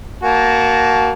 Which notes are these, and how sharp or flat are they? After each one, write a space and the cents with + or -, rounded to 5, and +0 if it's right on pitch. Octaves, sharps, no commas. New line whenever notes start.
A#3 +0 F#4 +15 A5 -25